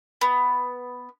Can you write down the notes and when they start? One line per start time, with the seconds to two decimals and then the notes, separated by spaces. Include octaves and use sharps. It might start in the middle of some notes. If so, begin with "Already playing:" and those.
0.21 B3